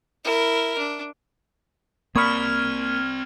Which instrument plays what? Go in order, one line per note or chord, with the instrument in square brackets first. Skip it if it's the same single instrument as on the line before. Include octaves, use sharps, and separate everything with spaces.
[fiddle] E4 A#4
D4
[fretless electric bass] A#3 [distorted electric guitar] C4 D5 [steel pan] B5 C#6 D#6 [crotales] F6 G#6